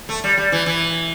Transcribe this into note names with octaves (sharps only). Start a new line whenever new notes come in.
A3
G3
G3
E3
E3